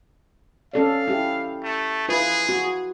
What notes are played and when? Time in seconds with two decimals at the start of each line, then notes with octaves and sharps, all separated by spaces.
0.73 C#4 A4 D5 F5
1.08 E4 G4
1.63 A3
2.09 E4 F4 G#4 B4
2.49 F#4